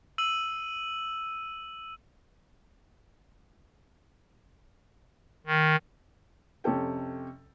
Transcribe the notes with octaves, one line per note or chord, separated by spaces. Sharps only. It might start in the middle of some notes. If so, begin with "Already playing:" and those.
E6 D#7 F#7
D#3
F2 C3 C#4 A4 G5